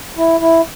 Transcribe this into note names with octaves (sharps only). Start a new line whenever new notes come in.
E4
E4